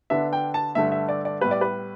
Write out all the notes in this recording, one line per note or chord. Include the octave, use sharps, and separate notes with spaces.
D3 B3 D4 E5
G5
A5
G2 D3 A3 E5
E5
D5
D5
A2 G3 B3 B4
D5
B4